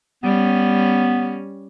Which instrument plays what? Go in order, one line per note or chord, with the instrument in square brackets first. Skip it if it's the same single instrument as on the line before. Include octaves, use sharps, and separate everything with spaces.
[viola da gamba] G3 C#4 [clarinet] B3